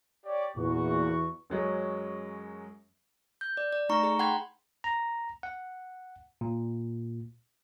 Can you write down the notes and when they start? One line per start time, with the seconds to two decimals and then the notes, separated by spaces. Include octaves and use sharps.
0.25 G4 C#5 D5
0.57 E2 A#2 F#4 C#6
1.50 F#2 F#3 G#3 C#4
3.41 G6
3.57 D5
3.73 D5
3.89 A3 D#4 A#5 C#6
4.03 G#4 A#5
4.19 F#5 G5 B5 C6 G#6
4.84 A#5
5.43 F#5
6.41 A#2